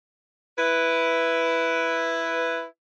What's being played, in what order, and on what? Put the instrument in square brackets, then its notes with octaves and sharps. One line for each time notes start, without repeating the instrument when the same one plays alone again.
[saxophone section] E4 B4